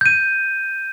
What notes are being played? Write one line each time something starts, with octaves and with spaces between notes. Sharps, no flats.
G6 D#7